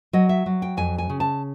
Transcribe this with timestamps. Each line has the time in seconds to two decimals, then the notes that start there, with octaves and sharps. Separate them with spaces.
0.13 F#3 D#5
0.29 E5
0.46 F#3
0.62 G5
0.77 F2 G#5
0.98 G#5
1.09 C#3
1.20 A5